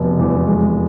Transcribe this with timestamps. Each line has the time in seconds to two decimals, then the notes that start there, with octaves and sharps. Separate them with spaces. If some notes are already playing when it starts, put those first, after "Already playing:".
Already playing: F1 B2
0.19 E2
0.47 G#3